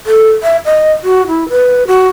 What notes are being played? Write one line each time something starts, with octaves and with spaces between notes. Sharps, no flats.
A4
E5
D#5
F#4
E4
B4
F#4